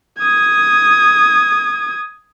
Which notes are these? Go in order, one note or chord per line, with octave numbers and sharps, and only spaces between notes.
D#6 G#6